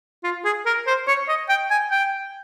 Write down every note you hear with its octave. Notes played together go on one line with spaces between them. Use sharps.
F4
G#4
A#4
C5
C#5
D#5
G5
G#5
G5